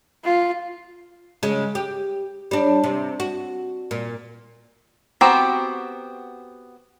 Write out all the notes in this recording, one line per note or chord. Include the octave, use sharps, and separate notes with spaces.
F4
C#3 G#3
G4
G3 D4
C3
F#4
A#2
B3 C4 F#4 G4 A#5